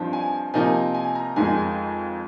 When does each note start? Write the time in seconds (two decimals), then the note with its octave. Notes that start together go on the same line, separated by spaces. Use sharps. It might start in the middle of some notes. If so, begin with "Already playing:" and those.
Already playing: G2 F3 C4 D#4
0.13 G#5
0.54 C3 F3 A#3 D#4 G#5
0.94 G#5
1.15 A#5
1.36 F2 D#3 G#3 D#4 G#5